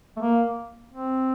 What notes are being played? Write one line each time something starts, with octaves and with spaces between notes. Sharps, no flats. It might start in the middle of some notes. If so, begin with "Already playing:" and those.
A3
A#3
C4